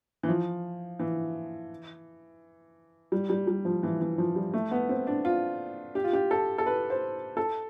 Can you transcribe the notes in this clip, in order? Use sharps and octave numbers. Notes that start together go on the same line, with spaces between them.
E3
F3
E3
G3
G3
G3
F3
E3
E3
F3
G3
A3
B3
C4
D4
F4
G4
F4
G4
A4
A4
B4
C5
A4